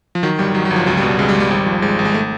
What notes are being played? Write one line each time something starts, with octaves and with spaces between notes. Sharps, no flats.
F3
D#3 F#3
G1 G3
D#3 F#3
F#3
G1
F3
C#2 F#3
G3
B2
G3
C#2 G#3
G3
C#2
G3
G#1 G3
F3
G#1 G#3
G#1
G#3
A3